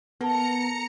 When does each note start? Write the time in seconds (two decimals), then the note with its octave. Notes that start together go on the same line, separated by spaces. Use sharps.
0.21 B3 A4 A#4 A#5 C#7